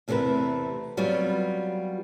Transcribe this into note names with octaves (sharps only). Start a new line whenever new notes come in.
E2 C3 A3 F#4 A#4 B4
F#3 G3 B3 C4 F4 F#4